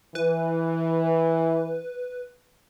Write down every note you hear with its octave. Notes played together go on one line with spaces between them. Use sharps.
E3 B4